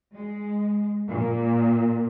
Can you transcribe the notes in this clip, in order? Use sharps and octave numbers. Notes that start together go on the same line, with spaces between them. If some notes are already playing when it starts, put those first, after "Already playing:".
G#3
A#2